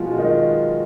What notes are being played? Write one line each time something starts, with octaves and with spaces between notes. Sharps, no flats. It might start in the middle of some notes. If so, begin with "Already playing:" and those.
Already playing: B2 F3 G#3 F4 F#4
D#3 D#4